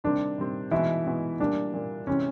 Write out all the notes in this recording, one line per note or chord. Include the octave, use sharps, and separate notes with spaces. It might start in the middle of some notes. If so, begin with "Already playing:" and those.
C3 D#3 G3 C4 D4
C3 D#3 G3 C4
B2 E3 G#3 B3 D#4 E4 F#4
B2 G#3 B3 D#4 F#4
A#2 G3 A#3 D4
A#2 G3 A#3
C3 E3 G#3 C#4